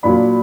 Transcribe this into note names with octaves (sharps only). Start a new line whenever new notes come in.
A#2 F#3 A#3 D4 B5